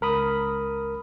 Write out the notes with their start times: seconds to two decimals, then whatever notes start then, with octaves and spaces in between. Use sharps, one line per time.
0.01 C#2 A#4 B5 D#6